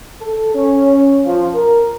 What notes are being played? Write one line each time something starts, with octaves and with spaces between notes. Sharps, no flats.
A4
C#4
F3
A#4